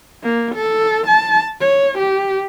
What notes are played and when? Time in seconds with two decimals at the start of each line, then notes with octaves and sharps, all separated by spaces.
0.23 A#3
0.55 A4
1.07 A5
1.60 C#5
1.98 G4